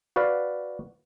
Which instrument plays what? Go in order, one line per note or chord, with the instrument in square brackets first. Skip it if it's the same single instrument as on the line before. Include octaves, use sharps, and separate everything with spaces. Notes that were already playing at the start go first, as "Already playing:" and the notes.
[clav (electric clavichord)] F#4 B4 D5 F5